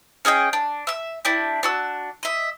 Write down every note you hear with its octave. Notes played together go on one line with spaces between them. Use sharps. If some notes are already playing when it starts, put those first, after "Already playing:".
C#4 G#4 D#5 G5
D4
E5 E6
D4 E4 G4
D4 F#4 E6
D#5 E5